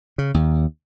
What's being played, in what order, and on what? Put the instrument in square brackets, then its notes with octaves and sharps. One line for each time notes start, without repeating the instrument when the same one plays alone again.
[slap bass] C#3
D#2